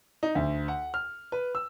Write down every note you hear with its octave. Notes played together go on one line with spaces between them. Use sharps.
D#4
D2
F#5
F6
B4
E6